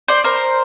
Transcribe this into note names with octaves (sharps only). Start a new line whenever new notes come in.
C5 D5
A#4 C5